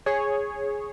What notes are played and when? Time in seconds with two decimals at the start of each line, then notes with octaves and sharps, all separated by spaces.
0.06 G#4 C#5